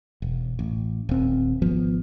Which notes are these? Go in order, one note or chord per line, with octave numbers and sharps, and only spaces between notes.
E1
A1
D#1 C4
G#1 F3 B3